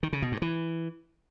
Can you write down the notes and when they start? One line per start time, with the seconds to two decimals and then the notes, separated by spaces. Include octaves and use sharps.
0.03 D#3
0.13 C#3
0.22 B2
0.32 G2
0.42 E3